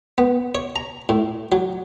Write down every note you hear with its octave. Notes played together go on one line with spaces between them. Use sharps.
B3
C#5
A#5
A2
F#3